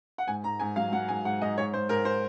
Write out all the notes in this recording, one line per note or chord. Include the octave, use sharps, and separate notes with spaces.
F#5
G#2 G#5
G#2 A#5
G#2 G#5
F#3 F5
F#3 F#5
G#2 G#5
G#2 F#5
G#2 D#5
G#2 C#5
G#2 C5
G#2 A#4
C5